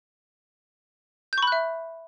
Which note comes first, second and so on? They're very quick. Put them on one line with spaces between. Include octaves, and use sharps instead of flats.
G6 C#6 B5 F#6 E5